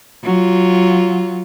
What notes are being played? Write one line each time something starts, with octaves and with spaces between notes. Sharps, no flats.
F#3 F4